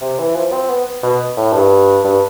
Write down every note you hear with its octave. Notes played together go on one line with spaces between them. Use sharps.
C3
E3
F3
C4
B3
B2
A2
G2
G2